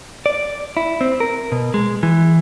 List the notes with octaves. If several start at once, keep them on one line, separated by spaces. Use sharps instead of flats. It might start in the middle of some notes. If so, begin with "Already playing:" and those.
D5
E4
C4
A#4
B2
G#3
E3